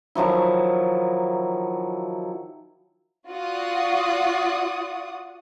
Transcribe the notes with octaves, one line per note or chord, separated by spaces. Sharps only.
D#3 F3 F#3 E4
F4 F#4 D5 F#5 D#6